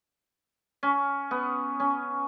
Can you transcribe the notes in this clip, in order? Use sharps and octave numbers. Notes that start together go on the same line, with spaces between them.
C#4
B3
C#4